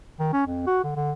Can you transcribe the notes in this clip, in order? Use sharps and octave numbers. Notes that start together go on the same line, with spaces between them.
D#3
C#4
F2
F#4
D3
D3